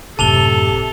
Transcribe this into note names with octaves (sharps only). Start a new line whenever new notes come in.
G1 F#2 A2 C3 A4 A5 F7 G7